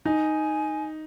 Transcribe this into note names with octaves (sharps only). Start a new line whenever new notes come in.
D#4 G#5